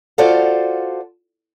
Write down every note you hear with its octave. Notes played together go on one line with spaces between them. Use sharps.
F4 F#4 A4 C5 D5 F5